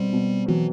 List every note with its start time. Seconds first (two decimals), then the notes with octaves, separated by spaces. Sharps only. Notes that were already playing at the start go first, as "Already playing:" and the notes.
Already playing: B2 G3 C4
0.13 B2
0.48 E3 F#3